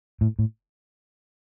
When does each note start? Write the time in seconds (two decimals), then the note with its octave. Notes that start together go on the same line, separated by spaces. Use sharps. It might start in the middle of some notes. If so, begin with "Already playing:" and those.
0.21 A2
0.39 A2